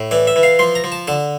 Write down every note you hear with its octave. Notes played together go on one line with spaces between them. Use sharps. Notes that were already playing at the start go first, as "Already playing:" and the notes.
Already playing: A2
E3 D5
E5
E3
F5
F3 C6
A#5
F3
A5
D3 A5